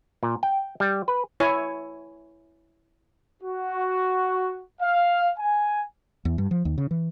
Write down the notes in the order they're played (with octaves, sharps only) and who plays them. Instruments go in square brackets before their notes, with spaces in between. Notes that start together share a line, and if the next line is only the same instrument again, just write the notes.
[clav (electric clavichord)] A#2
G5
G3
B4
[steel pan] E4 C#5 G#5
[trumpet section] F#4
F5
G#5
[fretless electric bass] E2
G2
F3
D#2
C#3
E3